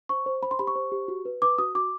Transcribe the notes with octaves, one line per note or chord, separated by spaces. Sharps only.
C5 C#6
C5
C5 B5
C6
G4 B5
C#6
C5
G4
F#4
B4
B4 D6
F#4 D#6
F#4 D6